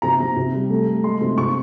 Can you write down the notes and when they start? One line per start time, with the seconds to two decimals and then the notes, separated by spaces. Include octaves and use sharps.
0.02 C3 A#5
0.20 C3
0.37 C3
0.54 G3
0.70 A3
0.87 A3
1.03 G#3 C6
1.21 C3
1.38 C3 C#6